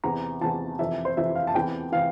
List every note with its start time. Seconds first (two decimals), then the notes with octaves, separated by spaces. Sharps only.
0.04 E2 C3 E3 A#5
0.41 E2 C3 E3 A5
0.79 F2 C3 E3 E5
1.05 C5
1.17 F2 C3 E3 E5
1.35 F5
1.47 A5
1.54 E2 C3 E3 G5
1.92 C3 E3 F5